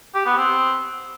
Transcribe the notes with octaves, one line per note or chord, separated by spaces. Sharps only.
G4
B3
C4